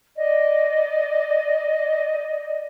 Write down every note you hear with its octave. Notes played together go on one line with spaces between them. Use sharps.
D5 D#5